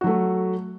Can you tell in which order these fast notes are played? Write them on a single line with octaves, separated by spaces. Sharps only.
F#4 F#3 A3